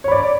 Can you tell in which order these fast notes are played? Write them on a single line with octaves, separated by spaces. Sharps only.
C#5 B5 D5